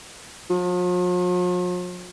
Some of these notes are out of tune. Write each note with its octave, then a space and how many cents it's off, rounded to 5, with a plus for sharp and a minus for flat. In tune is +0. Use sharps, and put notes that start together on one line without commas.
F3 +45